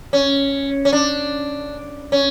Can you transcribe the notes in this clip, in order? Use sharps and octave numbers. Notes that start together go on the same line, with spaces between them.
C#4
C#4
D4
C#4